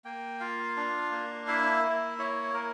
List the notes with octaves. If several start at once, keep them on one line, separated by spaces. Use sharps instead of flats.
A#3 G5
F4 F5
D4
A#3
E4 E5
A#3
E4 C#5
A#3 A#4